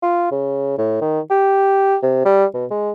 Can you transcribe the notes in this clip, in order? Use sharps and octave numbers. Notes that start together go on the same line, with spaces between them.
F4
C#3
A2
D#3
G4
C3
G3
B2
G#3